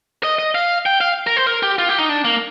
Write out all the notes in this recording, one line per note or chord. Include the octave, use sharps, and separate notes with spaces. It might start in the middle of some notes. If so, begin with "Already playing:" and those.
D#5
D#5
F5
G5
F5
A#4
C5
A#4
G4
F4
G4
D#4
D4
A#3